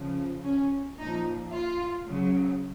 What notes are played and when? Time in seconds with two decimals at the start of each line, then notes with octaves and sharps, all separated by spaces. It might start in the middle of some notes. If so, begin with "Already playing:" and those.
Already playing: C#3 F3
0.44 C#4
0.98 A#2 F3 D#4
1.52 F4
2.06 C#3 F#3